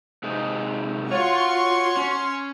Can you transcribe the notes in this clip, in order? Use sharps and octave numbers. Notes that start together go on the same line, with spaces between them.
C3 G#3 D#4
F4 F#4 C#5 C6 C#6
C#4